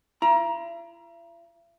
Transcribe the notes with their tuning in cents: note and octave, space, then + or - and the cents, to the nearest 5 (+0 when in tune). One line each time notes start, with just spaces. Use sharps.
E4 +45 A#5 +25